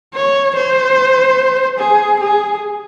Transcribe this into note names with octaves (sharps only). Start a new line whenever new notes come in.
C#5
C5
G#4
G#4